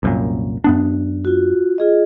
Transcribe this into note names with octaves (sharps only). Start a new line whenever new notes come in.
C2 F#2 A#2
F#2 B3 D4
F4 F#4
F4 G#4 D#5